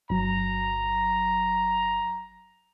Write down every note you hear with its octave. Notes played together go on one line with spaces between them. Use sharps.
G1 F#3 A#5